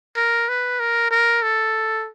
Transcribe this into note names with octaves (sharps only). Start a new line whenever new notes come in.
A#4
B4
A#4
A#4
A4